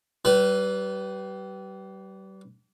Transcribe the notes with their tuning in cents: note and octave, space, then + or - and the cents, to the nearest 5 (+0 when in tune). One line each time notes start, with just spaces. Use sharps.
G3 -35 B4 +0